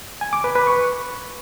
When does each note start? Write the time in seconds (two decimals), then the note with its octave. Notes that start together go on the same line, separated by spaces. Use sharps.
0.21 G#5
0.33 D6
0.44 B4
0.56 B4
0.67 C#6